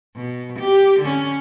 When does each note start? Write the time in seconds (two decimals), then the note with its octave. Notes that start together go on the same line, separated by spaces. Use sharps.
0.16 B2
0.59 G4
1.00 D3 C#4